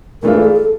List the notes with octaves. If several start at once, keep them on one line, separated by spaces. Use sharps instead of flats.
G#2 E3 A3 D4 F4 A#4
A4
G#4
A4